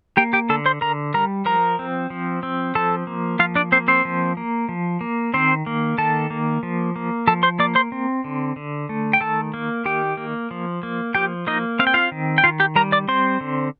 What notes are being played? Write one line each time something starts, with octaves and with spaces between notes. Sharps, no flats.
A#3 G4 G5
G4 G5
D3 A4 A5
C5 C6
D3 A#4 A#5
G3 A#4 A#5
F3 A#4 A#5
C4
F3
C4
F3 A4 A5
A#3
F3 F4 F5
D4 D5
A#3 C4 C5
C4 C5
F3
A#3
F3
A#3
D#3 C4 C5
A#3
D#3 A4 A5
A#3
F3
A#3
F3 A4 A5
C5 C6
A#3 D5 D6
C5 C6
C4
D3
D3
A3
G5
D#3 A4 A5
A#3
D#3 G4 G5
A#3
F3
A#3
F3 G4 G5
A#3 D#4 D#5
C4 F5
G5
F4 F5
D#3
G5
D#3 F4 F5
G4 G5
G3 A#4 A#5
D5 D6
C4 C5 C6
D3